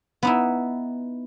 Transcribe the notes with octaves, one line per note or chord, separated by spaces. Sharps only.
B3 D#4 E4